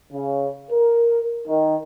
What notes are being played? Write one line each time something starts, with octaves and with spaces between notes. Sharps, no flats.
C#3
A#4
D#3